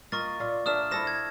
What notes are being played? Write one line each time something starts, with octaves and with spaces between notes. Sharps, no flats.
A#3 F4 D#5 C#6 A6
A#2 F4
A#3 D4 E5 D#6 F6 E7
E4 A4 C5 D#6 A#6 E7
G#6